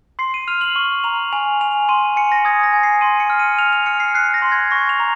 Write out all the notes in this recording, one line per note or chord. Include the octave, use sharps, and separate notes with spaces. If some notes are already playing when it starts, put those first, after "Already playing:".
C6 C7
D#7
F6 F7
F#7
C#6
A#5 F7
G#5 F7
G#5 F7
C6 D#7
G#5 C#7
A#6
D#6 G#6
A#6
G#5
C7
C6 D#7
C#7
F6
D#7
F6 F7
F7
F6 C#7
C7
F#6 C7
A#6
C6
G#6
C#6 A#6
F7
A#5